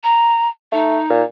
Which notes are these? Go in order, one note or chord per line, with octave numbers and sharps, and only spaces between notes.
A#5
A3 D#4
A#2